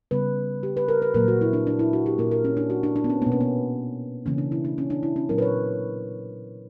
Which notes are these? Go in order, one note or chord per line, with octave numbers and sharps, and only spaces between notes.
C#3 G3 B3 B4
G4
B4
A#4
B4
A#2 F#3 A#3 A#4
F#4
E4
D4
D4
E4
F#4
G4
A#2 A#3 A#4
A#4
C#4
D4
F#4
D4
D4
B3
C#4
B2 A#3 B3
C#4
B3
C#3 E3 A#3 C#4
D4
E4
D4
C#4
D4
E4
C#4
A#2 F#3 B3 A#4
B4
C#5